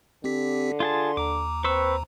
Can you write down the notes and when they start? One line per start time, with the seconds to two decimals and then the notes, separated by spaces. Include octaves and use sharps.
0.24 D3 C4 G4 B6
0.80 F4 G#4 A5 C6
1.17 D#2 A#5 D6
1.64 C4 B4 C#6 E6